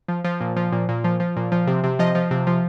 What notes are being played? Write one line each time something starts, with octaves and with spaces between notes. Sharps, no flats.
F3
F3
A#2
F3
A#2
A#2
F3
F3
A#2
F3
C3
C3
F3 D#5
F3
C3
F3